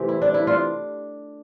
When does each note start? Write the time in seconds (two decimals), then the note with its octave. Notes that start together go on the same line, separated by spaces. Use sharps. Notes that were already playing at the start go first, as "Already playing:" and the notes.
Already playing: C3 E3 A3 C4 G4
0.09 E4
0.22 D4
0.34 E4
0.47 D4 F4